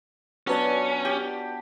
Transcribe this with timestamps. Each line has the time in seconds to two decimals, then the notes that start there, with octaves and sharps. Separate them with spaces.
0.47 F#3 B3 C#4 D4 F#4 B4 D5
1.05 G4